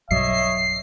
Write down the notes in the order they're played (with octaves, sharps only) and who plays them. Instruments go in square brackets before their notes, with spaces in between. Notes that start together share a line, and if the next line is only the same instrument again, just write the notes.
[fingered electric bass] B1 G2 F#3 [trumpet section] C#5 D#5 E5 [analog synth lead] C7